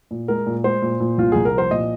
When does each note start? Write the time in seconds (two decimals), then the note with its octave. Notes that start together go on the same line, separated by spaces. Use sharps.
0.11 A#2
0.28 G#3 A#4
0.47 A#2
0.64 G#3 C5
0.82 A#2
1.00 A#2
1.18 C2 F4
1.32 C2 G#4
1.45 A#4
1.53 F3 C5
1.71 A#2 D#5